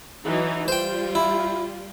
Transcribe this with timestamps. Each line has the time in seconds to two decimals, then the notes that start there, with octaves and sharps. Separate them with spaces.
0.24 E3 F#3 D#4
0.68 G3 F4 C5 G5
1.15 E4